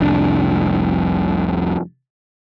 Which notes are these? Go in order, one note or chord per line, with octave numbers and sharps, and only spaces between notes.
F1 C2 D4